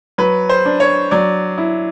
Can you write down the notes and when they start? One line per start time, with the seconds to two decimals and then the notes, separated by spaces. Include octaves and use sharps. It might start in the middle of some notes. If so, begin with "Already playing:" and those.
0.18 F#3 B4
0.49 C5
0.65 D4
0.80 C#5
1.11 F#3 D5
1.58 E4